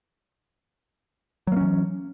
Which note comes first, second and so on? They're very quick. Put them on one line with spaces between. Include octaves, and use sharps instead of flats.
F#3 A#3 C#4 E3